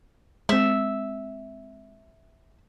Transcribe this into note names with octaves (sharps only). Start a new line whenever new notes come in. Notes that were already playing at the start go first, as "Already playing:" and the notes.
G#3 C4 E5